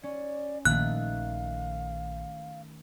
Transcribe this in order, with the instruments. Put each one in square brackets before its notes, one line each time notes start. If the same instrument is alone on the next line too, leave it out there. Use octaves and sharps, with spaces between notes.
[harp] C#4 [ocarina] D5
[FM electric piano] A#1 [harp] D#3 A3 [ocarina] F5 [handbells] F#6